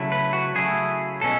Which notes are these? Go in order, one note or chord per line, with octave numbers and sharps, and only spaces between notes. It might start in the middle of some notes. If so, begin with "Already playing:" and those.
Already playing: C#3 F#3 A3 E4
B4
F#4
C#3 F#3 A3 E4 G#4
B2 G#3 C#4 A4